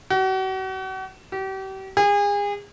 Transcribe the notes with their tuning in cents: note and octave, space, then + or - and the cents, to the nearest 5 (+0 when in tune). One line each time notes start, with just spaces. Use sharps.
F#4 +40
G4 -35
G#4 -35